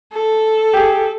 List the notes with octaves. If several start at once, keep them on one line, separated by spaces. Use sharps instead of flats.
A4
G4 G#4